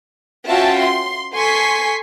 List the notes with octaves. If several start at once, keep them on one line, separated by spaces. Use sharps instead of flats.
C#4 F4 F#4 E5 G5 A5
C6
A4 G#5 C6 C#6 B6 C7